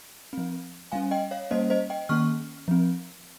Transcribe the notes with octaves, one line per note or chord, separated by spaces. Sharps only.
F3 C4
G3 C#4 F5 G#5
D#5 G5
C#5 F5
G3 A#3 C#4 C5 D#5
C5 D#5
D#5 G5
D#3 A#3 C#4 C#6 F6
F3 C4